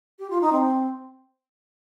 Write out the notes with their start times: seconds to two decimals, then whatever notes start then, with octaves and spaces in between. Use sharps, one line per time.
0.19 G4
0.30 F4
0.41 D#4
0.52 C4